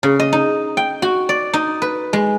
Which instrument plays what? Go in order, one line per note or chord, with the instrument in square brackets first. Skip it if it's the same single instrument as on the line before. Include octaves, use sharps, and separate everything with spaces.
[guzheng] C#3
D#5
D#4
G5
F#4
D5
D#4
B4
G#3